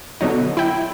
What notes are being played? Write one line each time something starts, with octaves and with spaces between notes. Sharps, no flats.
B2 D3 F#3 D#4
E4 G5